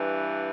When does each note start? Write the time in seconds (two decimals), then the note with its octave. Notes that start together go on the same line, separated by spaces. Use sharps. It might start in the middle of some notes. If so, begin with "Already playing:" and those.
Already playing: G2 E3